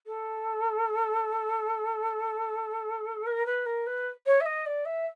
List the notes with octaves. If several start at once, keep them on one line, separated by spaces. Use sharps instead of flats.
A4
A#4
B4
A#4
B4
C#5
E5
D#5
D5
E5